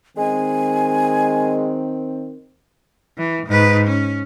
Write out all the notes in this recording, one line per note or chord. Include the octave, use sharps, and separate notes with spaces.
D#3 G#3 C4 G#5
E3
G#2 B4
C#4